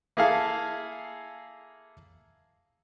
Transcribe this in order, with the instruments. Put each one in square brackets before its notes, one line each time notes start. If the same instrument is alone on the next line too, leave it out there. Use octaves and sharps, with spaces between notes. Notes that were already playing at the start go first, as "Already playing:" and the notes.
[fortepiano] A#3 E4 G#4 A4 F5